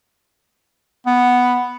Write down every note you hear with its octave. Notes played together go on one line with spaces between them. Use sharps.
B3